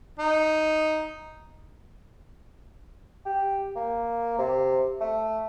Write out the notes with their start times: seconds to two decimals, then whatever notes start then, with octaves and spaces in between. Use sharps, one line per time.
0.19 D#4
3.26 G4
3.76 A#3
4.38 C3
5.01 A3